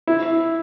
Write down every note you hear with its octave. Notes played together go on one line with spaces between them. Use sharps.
E4